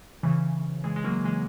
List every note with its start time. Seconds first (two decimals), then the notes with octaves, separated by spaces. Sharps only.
0.23 C#3 E3
0.84 E3 G#3
0.96 G#3
1.04 F#3 A#3
1.24 E3 G#3